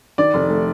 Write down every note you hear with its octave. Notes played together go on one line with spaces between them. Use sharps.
D#3 D5
F1
A3